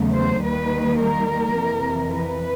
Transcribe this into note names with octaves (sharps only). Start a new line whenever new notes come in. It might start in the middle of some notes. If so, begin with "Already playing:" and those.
Already playing: E2 C#3 F#3 A3
C5
D#2 D#3 G3 A#3 B4
A#4
F2 C3 E3
B4